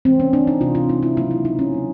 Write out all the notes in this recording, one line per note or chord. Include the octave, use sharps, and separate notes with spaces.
C3 E3 G#3 C4
C#4
D4
D#4
C3 E3 G#3 F4
F4
D#4
E4
C#3 F#3 A#3 F4
E4
D#4
C#4
C#3 F#3 A#3